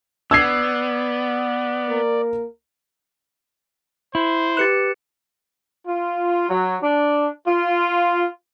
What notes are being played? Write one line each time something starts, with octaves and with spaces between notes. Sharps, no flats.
B3 D5 E6 G#6 C7
A#3 A#4
E4 C5
G4 B4 F#6 A6 C#7 E7
F4
F#3
D4
F4